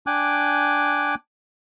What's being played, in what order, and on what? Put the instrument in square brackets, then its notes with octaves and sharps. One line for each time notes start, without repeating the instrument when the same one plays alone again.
[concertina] D4 G5 G#5 D6 F#6